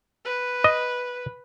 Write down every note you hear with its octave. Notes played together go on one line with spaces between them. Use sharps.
B4
D#5